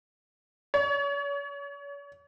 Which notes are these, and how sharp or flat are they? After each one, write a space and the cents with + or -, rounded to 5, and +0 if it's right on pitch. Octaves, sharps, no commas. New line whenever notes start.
C#5 +40